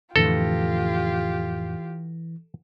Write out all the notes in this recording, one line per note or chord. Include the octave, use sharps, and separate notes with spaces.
F2 A2 D3 E3 F4 G4 A4 A#6